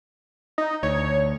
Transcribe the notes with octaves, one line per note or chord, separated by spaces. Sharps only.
D#4
D2 C#5